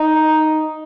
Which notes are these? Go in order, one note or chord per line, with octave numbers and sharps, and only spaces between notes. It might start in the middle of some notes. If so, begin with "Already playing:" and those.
Already playing: D#4